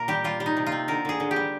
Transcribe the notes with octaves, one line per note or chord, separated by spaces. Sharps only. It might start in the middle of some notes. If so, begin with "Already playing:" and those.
Already playing: A#2 A#3 A#4
G3 G4
G3 F4
G3
D#4
C3
F4
C4
D3 A#4
D3 G#4
D3
G4
G3